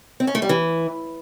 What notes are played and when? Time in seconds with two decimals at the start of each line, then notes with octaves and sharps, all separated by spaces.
0.20 C4
0.27 C#4
0.35 A3
0.42 G3
0.49 E3